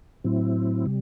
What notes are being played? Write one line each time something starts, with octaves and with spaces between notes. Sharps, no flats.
A2 F#3 C4 E4
C3 G3